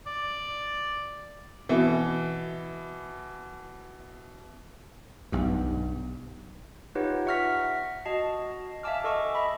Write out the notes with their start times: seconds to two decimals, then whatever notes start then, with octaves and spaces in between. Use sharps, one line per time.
0.07 D5
1.69 B2 E3
5.32 B1 G2
6.95 D#4 F4 G4 B4 C#5 F#5
7.26 E5 F#5 C#6 F6 A#6 B6
8.05 F#4 D#5 A5 C7
8.83 E5 F5 G#5 A5 D6 F6
9.04 A4 D#5 C#6 D6
9.35 D#5 E5 B5